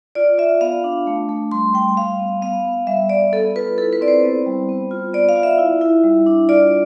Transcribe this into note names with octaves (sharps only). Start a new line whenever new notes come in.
F4 D5
F4 E5
B3 F5
D4
A3
A3
G3 C6
G3 G5
G3 F5
B3
B3 F5
B3
G3 E5
G3 D5
B3 A4
F4 B4
E4 A4
B4
C4 D5
C5
B3
G3
B3
F4
B3 D5
F5
F4
E5
E4
E4
G3
D4
F4 D5